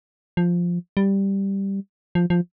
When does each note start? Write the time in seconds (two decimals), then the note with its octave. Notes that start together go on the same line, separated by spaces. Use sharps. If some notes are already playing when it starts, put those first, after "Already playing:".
0.37 F3
0.97 G3
2.15 F3
2.30 F3